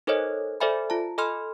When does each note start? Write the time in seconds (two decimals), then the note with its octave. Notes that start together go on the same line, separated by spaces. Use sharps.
0.07 D#4 A4 A#4 C5 C#5 D#5
0.60 A4 C5 D5 E5 G#5 B5
0.90 F4 A5
1.18 A4 D#5 G#5 B5 C6 F6